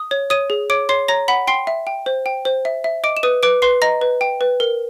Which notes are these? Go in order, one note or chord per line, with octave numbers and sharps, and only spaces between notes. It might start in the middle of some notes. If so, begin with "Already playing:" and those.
Already playing: D#6
C#5
C#5 D#6 D#7
G#4
C#5 D6 D7
C#5 C6 C7
C#5 A#5 A#6
F#5 B5 B6
G5 C6 C7
E5
G5
C5
G5
C5
E5
E5
D#5 D6 D7
E7
B4 D#6 D#7
B4 D6 D7
B4 C6 C7
D#5 A#5 A#6
B4
G5
B4
A#4